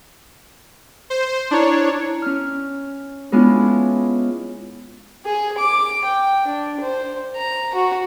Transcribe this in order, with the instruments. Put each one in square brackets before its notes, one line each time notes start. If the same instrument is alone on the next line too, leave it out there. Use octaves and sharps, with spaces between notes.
[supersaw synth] C5
[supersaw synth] D4 C#5 [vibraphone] E4 A#5
[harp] C#4 F6
G#3 B3 C#4 D4 E4 F4
[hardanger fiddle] G#4
D6
G5
D4
C5
A#5
F#4